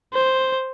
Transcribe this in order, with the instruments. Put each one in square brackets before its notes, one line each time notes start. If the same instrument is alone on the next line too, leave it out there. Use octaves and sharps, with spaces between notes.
[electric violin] C5